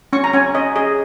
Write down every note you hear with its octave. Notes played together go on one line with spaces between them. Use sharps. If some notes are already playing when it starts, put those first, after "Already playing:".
C#4 C#6
A#5
C#4 G#5
C#5 D#5
G#4 D#5